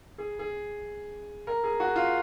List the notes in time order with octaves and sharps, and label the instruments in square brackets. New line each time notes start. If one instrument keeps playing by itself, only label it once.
[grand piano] G#4
G#4
A#4
G#4
F#4
F4